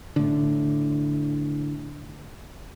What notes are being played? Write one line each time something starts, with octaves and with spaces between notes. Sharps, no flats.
A2 D3